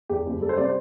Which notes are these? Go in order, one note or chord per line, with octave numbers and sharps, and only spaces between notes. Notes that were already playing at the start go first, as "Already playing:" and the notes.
E2 G4
F#1
G3 A4
C5
C3 D5
C5